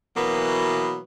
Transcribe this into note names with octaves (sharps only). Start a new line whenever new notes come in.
B2 E3 F#3 A#3 B3